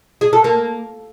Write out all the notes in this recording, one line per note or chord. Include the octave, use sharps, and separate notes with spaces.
G#4
A4
A#3